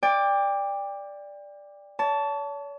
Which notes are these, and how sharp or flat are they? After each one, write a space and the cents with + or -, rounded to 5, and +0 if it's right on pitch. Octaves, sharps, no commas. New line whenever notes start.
D5 +0 G5 +30
C#5 +40 A5 +0